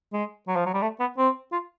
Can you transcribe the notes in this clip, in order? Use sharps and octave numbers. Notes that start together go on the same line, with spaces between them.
G#3
F#3
F3
F#3
G3
A3
B3
C4
F4